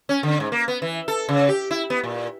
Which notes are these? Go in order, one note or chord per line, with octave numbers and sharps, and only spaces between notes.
C#4
D3
G#2
A#3
B3
E3
A4
C#3
G4
E4
B3
A#2